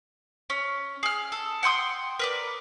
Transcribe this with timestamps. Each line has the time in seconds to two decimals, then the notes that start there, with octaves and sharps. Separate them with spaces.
0.50 C#4
1.03 G#4 F6
1.32 A4
1.63 F#5 G5 C6 D#6
2.19 A#4 B4 D5